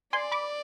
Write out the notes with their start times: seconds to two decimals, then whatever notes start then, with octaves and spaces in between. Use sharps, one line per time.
0.13 D5 G#5 C6
0.32 B5 D6